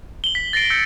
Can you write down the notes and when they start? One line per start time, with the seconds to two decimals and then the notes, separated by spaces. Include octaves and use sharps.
0.24 F#7 G7
0.35 B6
0.53 A6 A#6 C7 D7
0.70 E6 G6 C#7